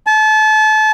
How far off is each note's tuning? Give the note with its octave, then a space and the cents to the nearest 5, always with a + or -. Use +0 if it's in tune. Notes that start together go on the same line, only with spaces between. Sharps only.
A5 -30